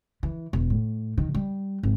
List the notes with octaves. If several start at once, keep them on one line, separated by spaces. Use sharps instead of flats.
E3
E1
A2
D#3
G3
G#1